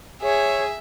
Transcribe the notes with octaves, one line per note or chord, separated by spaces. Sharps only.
G#4 C#5 E5